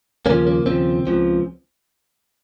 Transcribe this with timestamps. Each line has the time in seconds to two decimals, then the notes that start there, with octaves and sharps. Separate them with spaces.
0.26 D#2 C#3 F3 A#3 C#4
0.47 A#3
0.66 D#2 C#3 F3 C4
1.07 C#2 C#3 F3